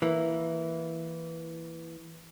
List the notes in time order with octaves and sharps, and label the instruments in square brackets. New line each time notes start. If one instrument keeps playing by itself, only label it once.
[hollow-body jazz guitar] E3 A#3